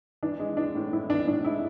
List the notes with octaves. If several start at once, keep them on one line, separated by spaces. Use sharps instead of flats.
E3 D4
G#3
E3 D4
A2
A2 E4
E3 D4
A2 D4
G#3 E4